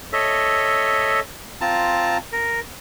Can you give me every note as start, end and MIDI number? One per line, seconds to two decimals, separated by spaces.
0.13 1.20 69
0.13 1.20 73
0.13 1.20 75
0.13 1.20 76
1.61 2.18 60
1.61 2.18 65
1.61 2.18 81
1.61 2.18 82
2.33 2.60 70